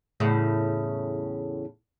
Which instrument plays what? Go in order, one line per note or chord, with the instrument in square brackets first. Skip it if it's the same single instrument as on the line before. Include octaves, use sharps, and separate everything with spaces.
[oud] E2 A2 C#3